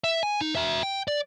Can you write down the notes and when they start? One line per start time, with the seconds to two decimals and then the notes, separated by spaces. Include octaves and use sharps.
0.04 E5
0.23 G#5
0.41 D#4
0.55 F#4 E5
0.83 G5
1.08 D5